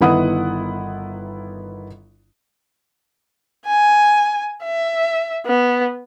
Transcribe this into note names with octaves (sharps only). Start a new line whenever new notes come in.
G1 D#3 B3 E4 F#5 D#6
G#5
E5
B3